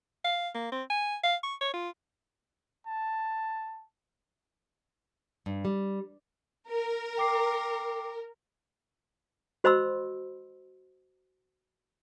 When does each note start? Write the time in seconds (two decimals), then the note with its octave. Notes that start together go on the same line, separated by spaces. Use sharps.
0.24 F5
0.55 A#3
0.72 C4
0.90 G#5
1.23 F5
1.43 C#6
1.61 C#5
1.74 F4
2.86 A5
5.46 G2
5.65 G3
6.69 A#4
7.17 G5 D6 C7
9.64 F#4 C5 D#5 B5 C6 E6